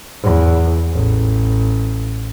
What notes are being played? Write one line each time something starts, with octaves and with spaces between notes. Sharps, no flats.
E2
A1